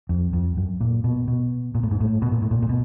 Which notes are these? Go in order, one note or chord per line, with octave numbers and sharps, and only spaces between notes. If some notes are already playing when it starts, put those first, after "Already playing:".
F2
F2
F#2
A#2
B2
B2
A#2
A2
G#2
A2
B2
A#2
A2
A#2
A#2
B2